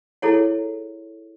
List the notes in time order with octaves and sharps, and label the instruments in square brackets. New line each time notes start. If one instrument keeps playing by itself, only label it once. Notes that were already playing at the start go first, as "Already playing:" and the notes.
[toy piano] E4 G#4 A4 C#5 F#5